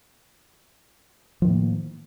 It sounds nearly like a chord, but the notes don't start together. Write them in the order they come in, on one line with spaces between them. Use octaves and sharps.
F3 D#3 A2 A#3